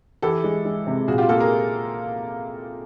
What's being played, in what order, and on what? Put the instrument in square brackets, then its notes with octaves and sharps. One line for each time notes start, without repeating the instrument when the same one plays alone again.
[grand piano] E3 [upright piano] G4 A4
[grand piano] G#3
G#3
C3
[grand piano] A#2 [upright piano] F#4 G#4
[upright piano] F4 G4
[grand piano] A#3 [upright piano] G4 A4
[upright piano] G#4 A#4